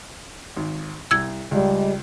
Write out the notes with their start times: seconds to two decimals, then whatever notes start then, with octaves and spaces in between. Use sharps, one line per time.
0.56 G#1
1.11 C2 E6 G#6
1.51 C#2 G3 G#3